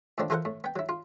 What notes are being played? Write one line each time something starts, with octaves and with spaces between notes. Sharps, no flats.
A2 D3 F3 C4 D4
E3 F4 A4 A#4 C5 F#5
A2
B3 G5
F#3 E4
F4